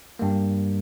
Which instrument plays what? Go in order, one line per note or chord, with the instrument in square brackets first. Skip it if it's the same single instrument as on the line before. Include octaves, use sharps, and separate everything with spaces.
[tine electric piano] G2 G3 A#3